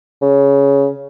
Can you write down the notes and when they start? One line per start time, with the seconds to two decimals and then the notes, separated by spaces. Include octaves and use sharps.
0.22 C#3